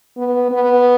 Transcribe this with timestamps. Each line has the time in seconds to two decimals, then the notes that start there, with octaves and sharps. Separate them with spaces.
0.17 B3
0.52 B3